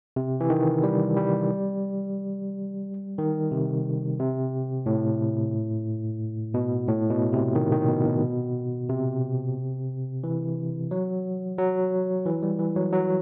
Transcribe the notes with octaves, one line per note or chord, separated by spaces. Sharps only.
C3
E3
D#3
G3
G3
D#3
C3
C3
A2
B2
A2
B2
C3
D#3
D#3
B2
B2
C3
E3
F#3
F#3
E3
G3
E3
F#3
F#3